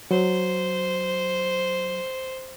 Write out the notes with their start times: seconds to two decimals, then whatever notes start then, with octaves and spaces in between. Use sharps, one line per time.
0.11 F#3 C5